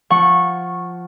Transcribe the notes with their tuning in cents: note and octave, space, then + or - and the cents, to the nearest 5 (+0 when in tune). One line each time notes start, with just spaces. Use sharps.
F3 +5 F#5 +0 C#6 -15